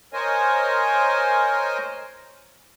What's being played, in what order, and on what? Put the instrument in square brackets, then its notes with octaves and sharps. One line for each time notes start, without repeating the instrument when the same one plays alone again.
[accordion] A#4 C5 C#5 D#5 G#5